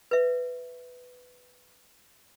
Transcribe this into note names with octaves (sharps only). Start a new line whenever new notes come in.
B4 E5